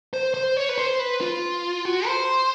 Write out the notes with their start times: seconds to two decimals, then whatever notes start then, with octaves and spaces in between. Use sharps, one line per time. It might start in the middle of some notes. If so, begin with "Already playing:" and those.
0.14 C5
0.34 C5
0.57 C#5
0.69 B4
0.78 C5
0.99 B4
1.21 F4
1.85 F#4
2.07 C5